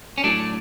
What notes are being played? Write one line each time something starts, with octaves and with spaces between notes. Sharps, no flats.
C#4
A2 F#3 A3 D4